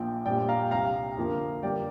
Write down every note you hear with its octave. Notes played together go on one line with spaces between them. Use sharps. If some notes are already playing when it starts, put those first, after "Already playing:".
Already playing: A#1 A#2 F3 G5
A#1 A#2 G3 D5 G5
F5 A#5
C2 C3 G3 F5 A#5
F2 D3 F3 A#3
G1 G2 G3 A#3 D5 G5